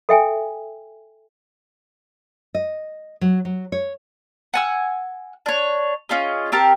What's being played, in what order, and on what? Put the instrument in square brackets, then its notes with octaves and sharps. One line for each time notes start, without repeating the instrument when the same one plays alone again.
[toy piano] A4 E5 G5 G#5
[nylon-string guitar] D#5
F#3
F#3
C#5
[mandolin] F#5 G#5 E6
D4 C#5
C#4 F4 G#4 D#5
C4 G4 A#4 A5